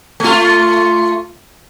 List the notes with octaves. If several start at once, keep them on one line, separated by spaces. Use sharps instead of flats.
A3 F4